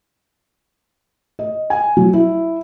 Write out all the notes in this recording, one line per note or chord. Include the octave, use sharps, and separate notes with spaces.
D#5
G#5
F#3
E4